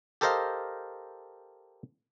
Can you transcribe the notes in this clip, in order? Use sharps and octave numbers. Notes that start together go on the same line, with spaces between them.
G4 A4 A#4 C5 D#5 F5